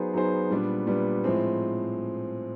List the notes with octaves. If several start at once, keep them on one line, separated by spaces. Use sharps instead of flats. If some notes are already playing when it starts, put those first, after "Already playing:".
Already playing: F#3 B3 D#4 G#4 C5
F#3 B3 D#4 G#4 C5
A#2 G3 B3 D4
A#2 G3 B3 D4
A2 F3 G#3 C4